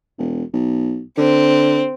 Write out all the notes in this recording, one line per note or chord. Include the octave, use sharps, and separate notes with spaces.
E1
B1
D3 C4